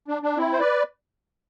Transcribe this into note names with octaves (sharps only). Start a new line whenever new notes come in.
D4
D4
C4 E4
C5
B4 D5